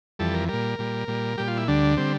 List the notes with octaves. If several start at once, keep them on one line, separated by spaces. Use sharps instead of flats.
F2 E3 G3 A4
A#4
A#2 G3 A#4
A#2 G3
A#2 G3
A#2 G3 G4
F4
E4
D2 D3 G3 D4
D3 G3 C4